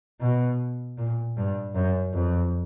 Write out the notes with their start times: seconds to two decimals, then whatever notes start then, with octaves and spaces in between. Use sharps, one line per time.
0.21 B2
0.98 A#2
1.37 G2
1.74 F#2
2.14 F2